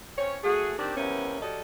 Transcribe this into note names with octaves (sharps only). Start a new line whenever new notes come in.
C4 C#4 C#5
A3 F#4 G#4
D#3 C4 D4 G4
E2 C3 A#3 B3 C#4
F#3 G3 A4 D#5